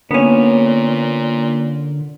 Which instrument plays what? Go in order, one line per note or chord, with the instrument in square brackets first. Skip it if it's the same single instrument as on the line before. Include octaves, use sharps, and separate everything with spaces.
[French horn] A#2 [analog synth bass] D3 [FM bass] A#3 [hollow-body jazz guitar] B3 C#4